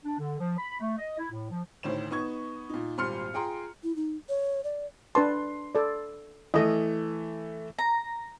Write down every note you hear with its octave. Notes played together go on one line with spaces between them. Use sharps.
D4
D3
F3
B5
A3
D#5
E4
A2
F3
D2 A2 D#3 C5 C#5 E7
B3 D#4 C#6 G#6
A#2 D#4
G#1 A#2 G3 C6 F6 C#7
F4 G#4 G5 A#5 C6
E4
D#4
C#5
D5
D4 B4 A5 C6
A4 D5
E3 A3 D#5 D#6
A#5